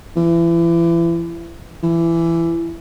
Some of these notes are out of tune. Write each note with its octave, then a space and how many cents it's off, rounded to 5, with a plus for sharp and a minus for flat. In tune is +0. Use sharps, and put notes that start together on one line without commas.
E3 +35
E3 +20